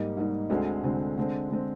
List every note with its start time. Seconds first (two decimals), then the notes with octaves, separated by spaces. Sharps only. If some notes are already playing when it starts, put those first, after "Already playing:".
Already playing: G#2 G3 A#3 D#4
0.17 G#2 G3 A#3 D#4
0.50 D2 D3 G#3 C4
0.83 D2 D3 G#3 C4
1.17 D3 G#3 C4
1.50 D3 G#3 C4